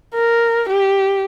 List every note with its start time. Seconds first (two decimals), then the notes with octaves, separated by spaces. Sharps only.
0.15 A#4
0.69 G4